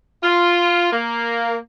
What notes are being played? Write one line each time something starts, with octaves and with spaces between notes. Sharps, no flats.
F4
A#3